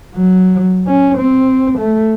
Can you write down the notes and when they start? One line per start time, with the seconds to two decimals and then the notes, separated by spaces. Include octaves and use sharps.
0.15 F#3
0.88 C#4
1.18 C4
1.78 A3